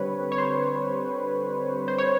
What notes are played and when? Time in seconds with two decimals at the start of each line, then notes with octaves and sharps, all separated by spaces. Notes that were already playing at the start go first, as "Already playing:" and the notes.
Already playing: D3 G3 C4 B4 C#5
0.32 C#5
0.38 C5
1.88 C5
1.98 C#5